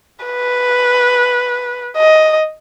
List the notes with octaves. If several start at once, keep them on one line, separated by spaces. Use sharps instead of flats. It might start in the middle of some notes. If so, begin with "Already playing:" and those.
B4
D#5